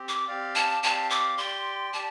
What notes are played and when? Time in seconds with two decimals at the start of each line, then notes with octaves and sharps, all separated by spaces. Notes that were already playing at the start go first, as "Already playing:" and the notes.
Already playing: C4 G4
0.09 D6
0.28 C4 G4 D5 F5
0.55 A5
0.82 C4 G4 D5 F5 A5
1.10 D6
1.38 G4 D5 G5 C6
1.93 G4 D5 A5